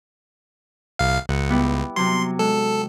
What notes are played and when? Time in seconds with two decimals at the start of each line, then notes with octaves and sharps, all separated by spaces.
0.99 C2 F5
1.29 C#2 F#5
1.49 G3 B3 E4
1.96 C3 F#3 C6
2.39 G#3 A4